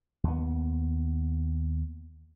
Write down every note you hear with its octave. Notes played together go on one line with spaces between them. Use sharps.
D#2 B3